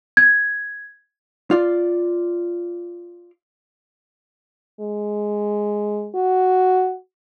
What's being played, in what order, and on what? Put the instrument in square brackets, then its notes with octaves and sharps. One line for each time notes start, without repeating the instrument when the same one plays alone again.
[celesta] G#6
[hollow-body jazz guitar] F4 D5
[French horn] G#3
F#4